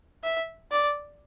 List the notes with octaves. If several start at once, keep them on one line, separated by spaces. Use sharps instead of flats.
E5
D5